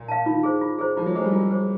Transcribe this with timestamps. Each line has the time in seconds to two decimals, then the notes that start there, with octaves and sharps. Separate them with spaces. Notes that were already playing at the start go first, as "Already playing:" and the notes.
Already playing: A#2
0.08 F5 A5
0.26 D#3 F4
0.43 G#4 C5
0.61 F4
0.79 G#4 C5
0.97 F3 F4
1.06 F#3
1.15 G#3 G#4
1.19 C5
1.24 G3
1.33 F#3 F4
1.51 G#4 C5